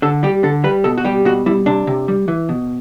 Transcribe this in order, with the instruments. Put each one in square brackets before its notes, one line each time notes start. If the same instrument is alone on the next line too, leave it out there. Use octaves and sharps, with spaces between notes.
[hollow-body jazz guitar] D3 A4
G3 G4
D3 A4
G3 B4
B2 A4
F#4
G3 G4
B2 F#4
G3 E4
C3 D4
C3
G3
E3
B2